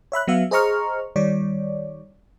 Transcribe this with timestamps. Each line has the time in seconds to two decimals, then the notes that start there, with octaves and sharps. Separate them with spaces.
0.12 C#5 E5 B5 F#6
0.28 F#3 B3 E5 F5
0.51 G#4 C5 D#5 A#5 C#6 F6
1.16 D#3 G3 C#5 D5